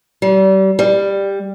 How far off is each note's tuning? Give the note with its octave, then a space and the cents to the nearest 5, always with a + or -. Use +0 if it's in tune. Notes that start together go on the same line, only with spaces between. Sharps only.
G3 -35
G3 +10